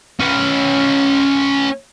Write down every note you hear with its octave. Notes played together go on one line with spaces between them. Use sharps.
C#4 B4